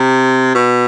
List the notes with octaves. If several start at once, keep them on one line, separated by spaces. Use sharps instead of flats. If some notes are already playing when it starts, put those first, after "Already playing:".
Already playing: C3
B2